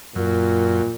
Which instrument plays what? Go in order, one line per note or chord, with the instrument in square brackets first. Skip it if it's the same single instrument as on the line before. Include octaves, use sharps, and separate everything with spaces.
[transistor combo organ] F#2 [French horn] A#2